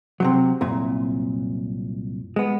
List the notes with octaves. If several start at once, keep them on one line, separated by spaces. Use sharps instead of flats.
C3 D#3 F#3
C2 F#2 A#2
G#3 B3